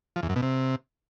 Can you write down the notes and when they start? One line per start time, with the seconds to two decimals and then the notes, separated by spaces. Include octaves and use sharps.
0.16 F3
0.23 E2
0.29 F#2
0.36 B2
0.42 C3